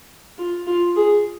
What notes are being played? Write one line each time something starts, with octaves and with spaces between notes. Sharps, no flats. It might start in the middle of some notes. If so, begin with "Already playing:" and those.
F4
F4
G#4